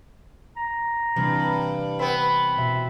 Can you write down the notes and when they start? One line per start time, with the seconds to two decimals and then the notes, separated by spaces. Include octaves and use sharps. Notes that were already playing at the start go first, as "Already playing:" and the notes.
0.57 A#5
1.16 G2 C3 E3 G3
1.99 B3 C4 B5
2.57 B2 E5